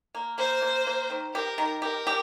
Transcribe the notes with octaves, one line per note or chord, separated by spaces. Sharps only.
A#3
A#3 C5
A#3
A#3
D#3
G4 A#4
D#3
G4 A#4
G4